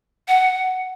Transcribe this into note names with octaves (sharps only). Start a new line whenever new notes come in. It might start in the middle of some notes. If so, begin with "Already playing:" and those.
F#5